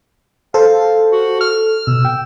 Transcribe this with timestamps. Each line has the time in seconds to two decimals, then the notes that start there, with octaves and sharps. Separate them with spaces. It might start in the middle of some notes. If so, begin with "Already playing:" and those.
0.54 A4 C5 F5
1.12 F#4
1.41 F6
1.87 B2 E6
2.05 G5